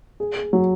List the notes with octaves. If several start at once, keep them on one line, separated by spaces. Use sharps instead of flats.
G#4
G#4
F#3